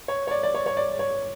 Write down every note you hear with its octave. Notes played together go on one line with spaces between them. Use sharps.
C#5
C#5
D5
D5
C#5
C#5
D5
C#5